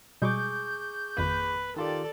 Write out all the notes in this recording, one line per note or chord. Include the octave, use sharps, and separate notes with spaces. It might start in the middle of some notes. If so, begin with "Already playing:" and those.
B2 G3 G#3 G#4 C#6 D6 G6
G#1 F2 A#3 B4
D#3 F4 G4 A4 D5